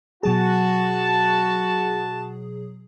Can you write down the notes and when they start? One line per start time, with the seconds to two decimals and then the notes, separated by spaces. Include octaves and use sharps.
0.23 B2 F#3 F#4 G#4 A5